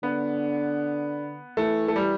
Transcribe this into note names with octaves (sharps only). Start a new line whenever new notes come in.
D3 B3
E3 A3
A3
G3